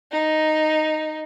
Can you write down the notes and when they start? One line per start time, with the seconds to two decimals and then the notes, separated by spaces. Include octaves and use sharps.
0.12 D#4